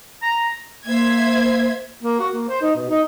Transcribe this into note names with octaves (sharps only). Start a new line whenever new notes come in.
A#5
A#3 C5 E5 G#6
A#3
F#4
A#3
C5
D#4
B2
D#4